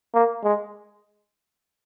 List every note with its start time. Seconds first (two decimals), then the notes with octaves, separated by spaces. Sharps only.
0.14 A#3
0.43 G#3